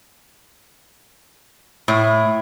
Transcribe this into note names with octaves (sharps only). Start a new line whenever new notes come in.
A2